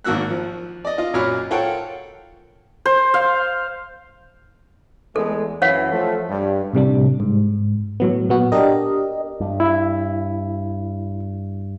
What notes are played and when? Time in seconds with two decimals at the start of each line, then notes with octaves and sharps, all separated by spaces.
0.04 G#1 A#3 F#4 E6 F#6
0.30 F3
0.85 D5 D#5
0.98 F4 D#5
1.14 F#2 A#2 F#3 C#5 B5 F6
1.51 F4 A4 A#4 C#5 F#5 G5
2.86 C5
3.14 F5
5.16 E2 G#3 A3 A4
5.62 F#2 E3 C#5 F5 F#5
5.91 F3 A3
6.29 G2
6.73 A2 C3 G3 D4
7.20 G#2
8.00 A2 F#3 B3
8.29 A#2 B3 F#4
8.52 D4 G4 A#4 D#5
9.40 G2
9.60 E4